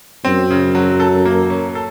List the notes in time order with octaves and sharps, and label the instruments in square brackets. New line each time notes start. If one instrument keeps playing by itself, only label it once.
[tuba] F#2 [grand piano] C4
[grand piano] C#3
F#3
A4
A#3
C#4
A4